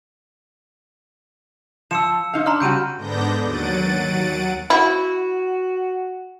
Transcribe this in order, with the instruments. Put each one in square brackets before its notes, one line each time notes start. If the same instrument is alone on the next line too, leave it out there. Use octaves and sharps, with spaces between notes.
[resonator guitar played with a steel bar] F3 [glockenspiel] E6 C#7 E7
[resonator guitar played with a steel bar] F3 D#4 F5
[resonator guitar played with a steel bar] D4 [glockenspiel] A#5 C6 F6
[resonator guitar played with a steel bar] C#3 G3 F#4 [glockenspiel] G6 D7 D#7
[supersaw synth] G#2 D3 B3 D4 G6 A#6
D#2 F#3 F#5 A6 D7 D#7
[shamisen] E4 [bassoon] F#4